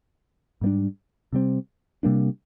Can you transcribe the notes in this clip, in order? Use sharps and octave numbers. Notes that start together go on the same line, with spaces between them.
G#2 G3 A#3 D4
C3 G3 C4
C3 G3 A#3 D4